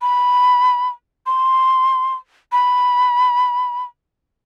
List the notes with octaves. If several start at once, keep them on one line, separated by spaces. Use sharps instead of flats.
B5
C6
B5